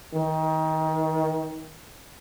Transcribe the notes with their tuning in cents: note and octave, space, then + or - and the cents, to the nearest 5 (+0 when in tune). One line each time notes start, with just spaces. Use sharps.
D#3 +25